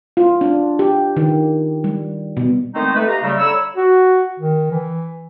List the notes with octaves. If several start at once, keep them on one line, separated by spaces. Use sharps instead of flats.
F4
D4
G4
D#3
G3
B2
D#3 G#3 A3 B3 C4 D#4
A3 B4
E4 G4 D#5 F5 A#5
C#3 G3 A3
D3 C#5 A#5 B5 E6
F#4
D#3
E3